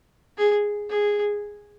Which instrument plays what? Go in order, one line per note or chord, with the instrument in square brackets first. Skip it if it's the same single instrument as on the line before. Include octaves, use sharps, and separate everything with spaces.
[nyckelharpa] G#4
G#4